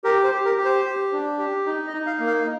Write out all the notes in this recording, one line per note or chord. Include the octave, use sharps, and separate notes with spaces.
G4 A#4
C5
G4
A#4
G4
C5
G4
D4
G4
D#4
D#5
D#4
F5
A#3
F5